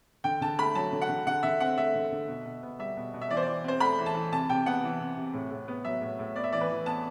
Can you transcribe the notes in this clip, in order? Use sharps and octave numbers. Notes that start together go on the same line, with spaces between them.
D3 G5
D3 A5
A3 B5
F#3 A5
D3
F#5
D3
D3 F#5
D3 E5
C4 F#5
A3 E5
D3
D3
B2
B2
B3
G3 E5
B2
B2
E5
E3 D5
C5
E3 D5
C4 C5
A3 B5
E3
A5
E3
C3 A5
C3 G5
B3 F#5
E3
C3
C3
A2
A2
B3
F#3 E5
A2
A2
B3 D5
E5
E3 D5
B4
E3
B3 A5